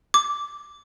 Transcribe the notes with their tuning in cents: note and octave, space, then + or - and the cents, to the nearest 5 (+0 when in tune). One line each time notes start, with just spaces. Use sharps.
D6 -5